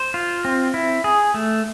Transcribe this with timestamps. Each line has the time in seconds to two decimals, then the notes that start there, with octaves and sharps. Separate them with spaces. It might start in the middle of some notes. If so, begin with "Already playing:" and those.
Already playing: C5
0.14 F4
0.45 C4
0.74 E4
1.04 G#4
1.34 A3